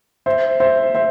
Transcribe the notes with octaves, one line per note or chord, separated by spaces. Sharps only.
C5 E5
C5 E5
C5 E5